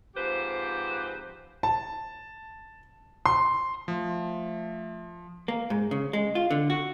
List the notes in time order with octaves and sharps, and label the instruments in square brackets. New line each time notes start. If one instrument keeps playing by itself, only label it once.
[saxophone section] G#2 F3 C4 G4 B4 C5
[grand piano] A5
C6
[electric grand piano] F3 [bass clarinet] A3
[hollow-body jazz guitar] A#3
G#2
C#3
G#3
F4
D3
F#4